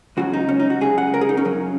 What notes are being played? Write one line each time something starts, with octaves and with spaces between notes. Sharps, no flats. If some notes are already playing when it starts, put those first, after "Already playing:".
C#2 C#3 F#3 F#4
D#4
C#4
D#4
F#4
C#2 C#3 F#3 G#4
F#5
A#4
G#4
D#4
C#4
F#2 C#3 F#3